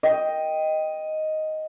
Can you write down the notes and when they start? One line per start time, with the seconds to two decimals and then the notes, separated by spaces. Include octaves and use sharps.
0.03 D#5 G5